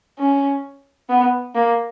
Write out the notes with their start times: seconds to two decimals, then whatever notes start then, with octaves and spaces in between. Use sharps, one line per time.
0.19 C#4
1.09 B3
1.55 A#3